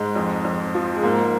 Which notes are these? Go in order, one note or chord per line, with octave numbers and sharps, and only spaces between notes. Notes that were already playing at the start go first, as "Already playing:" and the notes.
Already playing: G#2 G#3
F2
F2
F3
G#3
G#2 A#3